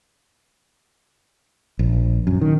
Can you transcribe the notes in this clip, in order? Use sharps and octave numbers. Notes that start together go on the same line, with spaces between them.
A#1
F#2
D#3